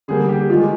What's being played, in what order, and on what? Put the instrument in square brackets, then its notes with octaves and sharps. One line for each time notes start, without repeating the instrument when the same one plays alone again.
[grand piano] D3 G3 A#3 G#4
G4
D#3 F4
G#3